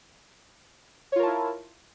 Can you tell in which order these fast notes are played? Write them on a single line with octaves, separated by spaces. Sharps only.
C#5 F4 A#4 A5 E4